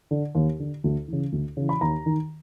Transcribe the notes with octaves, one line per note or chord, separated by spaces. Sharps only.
D3
D#2
D3
D2
C#3 E3
D2
C#3 E3
B5
D#2 A#5
D#3